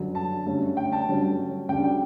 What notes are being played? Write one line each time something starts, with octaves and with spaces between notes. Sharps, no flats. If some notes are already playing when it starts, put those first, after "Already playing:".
Already playing: G1 F#2 D3 F#3
A5
G2 D3 A3 C#4
G5
A5
G1 G2 D3 F#3 C#4
D2 C#3 G3 D4 G5
G5